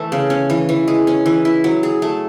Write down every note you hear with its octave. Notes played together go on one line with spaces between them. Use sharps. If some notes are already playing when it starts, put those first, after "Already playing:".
Already playing: E3 A3 E4
C#3
C#4
E3
E3
G#3
C#4
E3
E4
F#3
G#4
A3